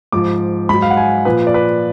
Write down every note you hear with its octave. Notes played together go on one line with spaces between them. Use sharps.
G#2 F3 D6
G#2 F#3 B5
F5
F#5
G#5
A#2 F3 B4
D5
B4